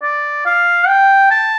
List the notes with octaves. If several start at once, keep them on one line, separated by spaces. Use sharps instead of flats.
D5
F5
G5
A5